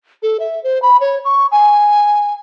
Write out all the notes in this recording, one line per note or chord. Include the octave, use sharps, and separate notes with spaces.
A4
E5
C5
B5
C#5
C#6
G#5